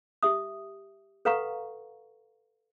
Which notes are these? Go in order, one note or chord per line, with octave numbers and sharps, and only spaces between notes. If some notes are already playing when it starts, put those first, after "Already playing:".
G4 E5 D#6
A4 B4 F5 F#5 A#5 C#6